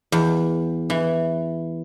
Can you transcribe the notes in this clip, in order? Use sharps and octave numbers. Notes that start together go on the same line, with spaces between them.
E2
E3